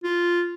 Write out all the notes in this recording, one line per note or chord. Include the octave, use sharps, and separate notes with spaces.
F4